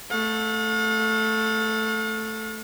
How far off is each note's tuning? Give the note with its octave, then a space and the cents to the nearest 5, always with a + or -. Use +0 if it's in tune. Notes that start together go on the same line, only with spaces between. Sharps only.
A3 +0 F5 +45